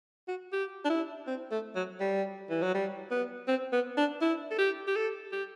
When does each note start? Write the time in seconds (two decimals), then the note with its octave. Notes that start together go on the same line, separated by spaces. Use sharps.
0.28 F#4
0.53 G4
0.85 D4
0.90 E4
1.27 C4
1.51 A3
1.75 F#3
2.00 G3
2.50 E3
2.62 F#3
2.74 G3
3.11 B3
3.48 C4
3.73 B3
3.97 D4
4.21 E4
4.51 A4
4.58 G4
4.87 G4
4.96 A4
5.32 G4